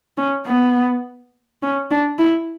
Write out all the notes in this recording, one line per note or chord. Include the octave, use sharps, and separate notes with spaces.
C#4
B3
C#4
D4
E4